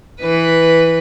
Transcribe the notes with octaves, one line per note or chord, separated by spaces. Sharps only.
E3 B4